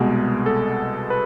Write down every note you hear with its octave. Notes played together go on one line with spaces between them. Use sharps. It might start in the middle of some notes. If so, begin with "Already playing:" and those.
Already playing: C2 B2 G#3 B3 G#4
A4
B4